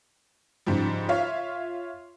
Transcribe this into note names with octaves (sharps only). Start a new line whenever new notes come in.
G#2 C#3 F3 G3
F4 C#5 E5 F5